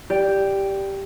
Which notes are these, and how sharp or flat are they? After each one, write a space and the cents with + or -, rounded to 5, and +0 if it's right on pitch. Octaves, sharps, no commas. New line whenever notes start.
G4 +0 D5 +0